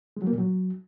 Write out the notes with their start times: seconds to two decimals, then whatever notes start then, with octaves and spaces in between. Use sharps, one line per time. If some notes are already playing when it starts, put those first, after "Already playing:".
0.17 G#3
0.22 F#3
0.27 A#3
0.33 A#2
0.38 F#3